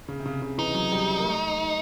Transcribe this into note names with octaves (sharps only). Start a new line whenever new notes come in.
C#3
C3
C#3
C#3
E3 D#4
F#3
G3
A#3
A3